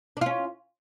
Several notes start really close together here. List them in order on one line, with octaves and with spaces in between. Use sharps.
D4 F4 C#4